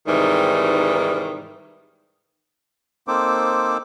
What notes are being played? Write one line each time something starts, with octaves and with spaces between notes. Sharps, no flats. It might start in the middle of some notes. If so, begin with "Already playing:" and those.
G#2 C3 D#3 E3 G3
A#3 C4 D#4 A4 C5 D6